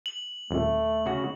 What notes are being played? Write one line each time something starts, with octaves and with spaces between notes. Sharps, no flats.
F#7
D#1 A3
C#3 F#4